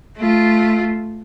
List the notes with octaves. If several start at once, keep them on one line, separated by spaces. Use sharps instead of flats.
A3 F4